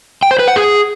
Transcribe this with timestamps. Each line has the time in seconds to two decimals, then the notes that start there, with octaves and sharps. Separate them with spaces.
0.23 G5
0.31 C5
0.39 B4
0.48 F#5
0.56 G#4